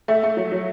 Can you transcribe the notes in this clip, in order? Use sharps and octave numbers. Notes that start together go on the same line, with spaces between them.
A3 E5
A3
F#3
F#3